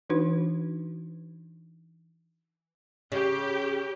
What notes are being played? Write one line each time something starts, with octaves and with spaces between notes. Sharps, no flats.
E3 D4 D#4 F#4 B4
C#3 G4